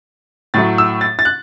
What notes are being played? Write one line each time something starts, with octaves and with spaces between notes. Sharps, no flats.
A2 F#3 A3 A6
E6
A6
A6
F#6